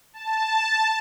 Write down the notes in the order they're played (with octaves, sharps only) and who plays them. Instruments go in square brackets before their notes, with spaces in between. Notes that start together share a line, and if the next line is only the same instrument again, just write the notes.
[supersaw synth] A5